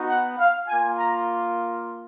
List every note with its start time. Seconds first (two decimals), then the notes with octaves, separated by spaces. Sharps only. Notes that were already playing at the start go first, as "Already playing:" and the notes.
Already playing: B3 D#4 F#4
0.10 F#5
0.39 F5
0.68 F4 G#5
0.73 A#3
0.98 A#5